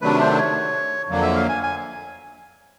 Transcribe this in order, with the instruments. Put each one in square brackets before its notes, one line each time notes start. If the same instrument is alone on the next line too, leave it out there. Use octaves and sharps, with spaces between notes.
[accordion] C3 D#3 F#3 A3 D4 [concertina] B4
[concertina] C5
C#5
[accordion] F2 D3 F#3 A#3
[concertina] E5
F5
G#5
G#5